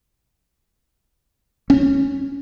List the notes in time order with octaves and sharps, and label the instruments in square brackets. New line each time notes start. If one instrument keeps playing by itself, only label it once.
[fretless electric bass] C#4